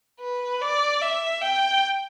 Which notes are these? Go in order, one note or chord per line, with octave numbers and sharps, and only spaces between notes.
B4
D5
E5
G5